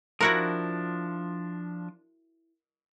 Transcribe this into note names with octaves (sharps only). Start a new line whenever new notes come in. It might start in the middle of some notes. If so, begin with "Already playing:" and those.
F3 D4 E4 F#4 A#4